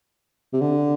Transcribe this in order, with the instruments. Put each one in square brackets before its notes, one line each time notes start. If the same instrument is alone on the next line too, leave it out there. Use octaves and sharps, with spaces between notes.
[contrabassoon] C3
D3